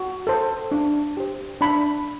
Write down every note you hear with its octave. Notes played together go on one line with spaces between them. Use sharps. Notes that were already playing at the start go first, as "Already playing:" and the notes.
Already playing: F#4
A4 C5
D4
G4 C5
D4 B5